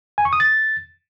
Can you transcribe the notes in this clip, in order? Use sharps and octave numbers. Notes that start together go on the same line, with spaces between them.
G#5
C#6
D#6
A6